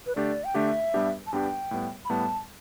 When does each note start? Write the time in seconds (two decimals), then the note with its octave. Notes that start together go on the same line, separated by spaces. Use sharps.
0.07 B4
0.16 D3 A3 D4 G4 D5
0.44 G5
0.54 D3 A3 D4 G4 E5
0.94 G2 G3 B3 D4 G4
1.27 A5
1.33 G2 G3 B3 D4 G4 G5
1.71 A2 G3 B3
2.05 B5
2.10 A2 G3 B3 A5